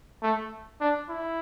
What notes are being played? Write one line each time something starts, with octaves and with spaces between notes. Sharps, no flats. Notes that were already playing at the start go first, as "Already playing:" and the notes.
A3
D4
E4